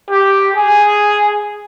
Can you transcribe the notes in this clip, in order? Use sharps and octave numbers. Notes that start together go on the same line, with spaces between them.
G4
G#4